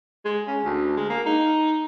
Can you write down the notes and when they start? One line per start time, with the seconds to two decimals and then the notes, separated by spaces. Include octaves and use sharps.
0.25 G#3
0.47 C#4
0.64 D2
0.97 G#3
1.09 A#3
1.26 D#4